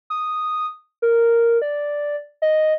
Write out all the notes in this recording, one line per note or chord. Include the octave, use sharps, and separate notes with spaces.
D#6
A#4
D5
D#5